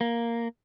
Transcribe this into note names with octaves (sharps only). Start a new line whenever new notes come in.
A#3